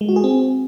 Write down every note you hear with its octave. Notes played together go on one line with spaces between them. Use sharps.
G#3
F#4
G#4
C4